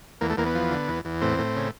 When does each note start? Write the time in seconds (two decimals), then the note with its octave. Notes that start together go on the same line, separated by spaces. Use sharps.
0.21 E2 A#3
0.30 A3
0.37 E2 A#3
0.46 B3
0.55 F3
0.71 D3
0.88 E2
1.05 E2
1.21 A2 C4
1.39 A2
1.56 C#3